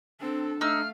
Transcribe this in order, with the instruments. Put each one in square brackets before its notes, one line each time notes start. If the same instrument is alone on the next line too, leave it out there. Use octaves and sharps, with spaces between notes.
[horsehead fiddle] C4 A4 [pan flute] D4
[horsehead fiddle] A3 F5 [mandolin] D#4 E6 [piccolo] F6